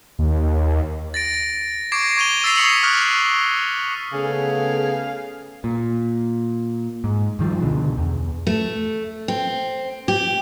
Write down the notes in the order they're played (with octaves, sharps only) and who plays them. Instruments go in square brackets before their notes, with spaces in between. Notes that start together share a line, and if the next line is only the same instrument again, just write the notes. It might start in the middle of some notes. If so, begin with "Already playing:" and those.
[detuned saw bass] D#2
[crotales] A6 A#6 D7
C#6 D6 G#6 A#6 C7 D7
C#6 G#6 D#7 F7 G7
E6 A6 B6 C7 D#7 F7
C#6 D#6 B6 C#7 F#7
C#6 D#6 F6 F#6
[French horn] C#3 [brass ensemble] A3 B3 A4 [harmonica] G#4 F5
[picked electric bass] A#2
G#2
G2 D#3 F3
C#2 B2 D3
E2
[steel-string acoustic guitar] A3
C4
G4